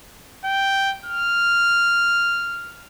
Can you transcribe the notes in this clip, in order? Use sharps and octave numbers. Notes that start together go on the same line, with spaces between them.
G5
F6